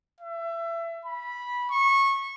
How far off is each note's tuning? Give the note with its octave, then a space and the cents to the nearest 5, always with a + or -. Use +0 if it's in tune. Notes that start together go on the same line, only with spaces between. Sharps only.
E5 +25
B5 -15
C#6 -20